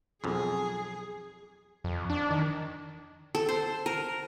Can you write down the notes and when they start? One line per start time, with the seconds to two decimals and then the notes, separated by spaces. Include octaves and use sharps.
0.24 B1 F2 G#4
1.84 F2
2.10 D4
2.31 D#3
3.35 A4
3.49 C5
3.86 A#4